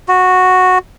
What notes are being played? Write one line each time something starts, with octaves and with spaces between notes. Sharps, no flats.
F#4